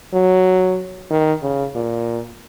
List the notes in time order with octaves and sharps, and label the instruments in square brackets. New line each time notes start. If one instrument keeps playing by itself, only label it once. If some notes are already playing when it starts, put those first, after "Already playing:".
[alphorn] F#3
D#3
C#3
A#2